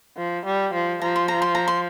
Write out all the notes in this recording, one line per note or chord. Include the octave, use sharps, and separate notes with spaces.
F3
G3
F3
F3 A#5
C6
A#5
C6
A#5
C6